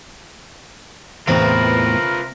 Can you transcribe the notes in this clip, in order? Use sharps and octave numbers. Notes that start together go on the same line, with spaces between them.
E2 A2 C3 C4 F4 A#4 B4 A#5